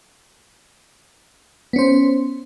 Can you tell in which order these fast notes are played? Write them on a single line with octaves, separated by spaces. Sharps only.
B3 C#4 C5